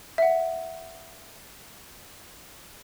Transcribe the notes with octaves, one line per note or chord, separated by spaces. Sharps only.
E5 F#5